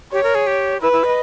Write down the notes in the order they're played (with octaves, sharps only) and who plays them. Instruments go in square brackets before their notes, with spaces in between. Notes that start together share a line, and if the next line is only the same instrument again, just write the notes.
[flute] G4 [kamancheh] C#5
[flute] A#4
G#4
G4
[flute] E4 [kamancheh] B4
[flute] E4
D#5